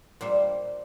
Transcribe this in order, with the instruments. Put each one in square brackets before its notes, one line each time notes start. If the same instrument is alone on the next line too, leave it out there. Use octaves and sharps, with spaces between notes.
[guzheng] A#2 G3 A#3 C5